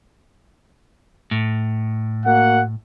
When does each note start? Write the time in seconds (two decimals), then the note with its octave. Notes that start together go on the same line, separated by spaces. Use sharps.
1.31 A2
2.26 A#3 F#4 F#5